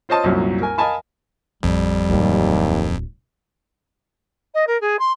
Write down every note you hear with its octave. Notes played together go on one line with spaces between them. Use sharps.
F4 C5 C#5 D#5 A5 C6
C2 F#2 A#2 F#3
A#4 G#5
A#4 D#5 F5 G#5 A5 B5
A1 F2 G3
D1 D#2 F#3
D#5
A#4
G#4
C6